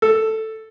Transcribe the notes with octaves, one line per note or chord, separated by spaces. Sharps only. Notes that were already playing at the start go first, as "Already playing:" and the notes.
A4